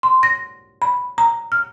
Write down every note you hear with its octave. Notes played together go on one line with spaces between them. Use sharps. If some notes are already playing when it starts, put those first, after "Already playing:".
C6
A#6
B5
A#5
F6